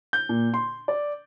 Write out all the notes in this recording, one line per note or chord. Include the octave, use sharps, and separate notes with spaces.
G6
A#2
C6
D5